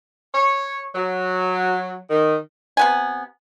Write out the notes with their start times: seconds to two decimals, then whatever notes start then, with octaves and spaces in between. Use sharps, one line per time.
0.35 C#5
0.95 F#3
2.10 D#3
2.77 C3 B3 G#5